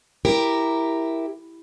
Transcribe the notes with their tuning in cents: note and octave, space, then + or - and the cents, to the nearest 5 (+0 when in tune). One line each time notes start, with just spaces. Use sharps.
E4 +0 G4 +10 A#4 +0